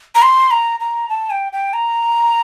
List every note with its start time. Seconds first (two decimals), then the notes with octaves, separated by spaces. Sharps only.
0.15 A#5
0.22 C6
0.51 A#5
0.80 A#5
1.09 A5
1.30 G5
1.53 G5
1.73 A#5